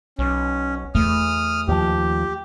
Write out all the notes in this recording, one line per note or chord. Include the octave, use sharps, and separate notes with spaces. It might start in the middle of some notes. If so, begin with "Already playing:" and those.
B1 C#4
E2 A3 D#6 F6
D#2 F3 G4